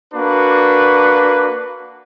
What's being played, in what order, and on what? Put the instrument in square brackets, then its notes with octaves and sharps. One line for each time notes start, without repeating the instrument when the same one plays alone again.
[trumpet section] A#3 D4 F#4 B4